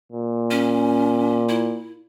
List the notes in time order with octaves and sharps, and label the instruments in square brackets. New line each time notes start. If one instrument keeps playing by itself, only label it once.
[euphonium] A#2
[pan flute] C#4
E4